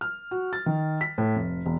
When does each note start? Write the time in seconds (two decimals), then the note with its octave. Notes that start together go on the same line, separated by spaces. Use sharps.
0.01 F6
0.31 F#4
0.53 A6
0.66 D#3
1.01 B6
1.18 A2
1.36 F1
1.66 E1